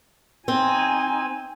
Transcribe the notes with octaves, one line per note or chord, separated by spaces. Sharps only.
C4 D#4 G#5